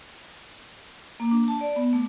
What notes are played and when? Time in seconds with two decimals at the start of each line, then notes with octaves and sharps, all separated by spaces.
1.20 A#3
1.31 D4
1.48 A5
1.61 D5
1.76 B3
1.93 A3